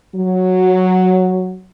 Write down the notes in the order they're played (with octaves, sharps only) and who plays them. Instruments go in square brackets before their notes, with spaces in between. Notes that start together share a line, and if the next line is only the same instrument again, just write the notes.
[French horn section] F#3